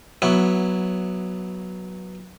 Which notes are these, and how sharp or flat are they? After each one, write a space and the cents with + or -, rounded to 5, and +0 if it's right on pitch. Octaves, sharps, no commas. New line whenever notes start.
F#3 +0 B3 -15 E4 +0